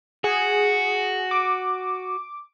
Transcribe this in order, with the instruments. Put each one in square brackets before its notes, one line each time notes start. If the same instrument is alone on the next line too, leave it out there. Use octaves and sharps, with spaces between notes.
[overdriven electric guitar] F#4 [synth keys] G#4
[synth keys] D6